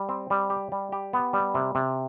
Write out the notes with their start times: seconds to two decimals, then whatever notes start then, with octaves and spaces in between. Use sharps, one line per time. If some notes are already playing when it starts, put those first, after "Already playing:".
Already playing: G3
0.09 C4
0.30 G3
0.50 G4
0.72 G3
0.92 G4
1.13 B3
1.33 G3
1.55 C3
1.75 C3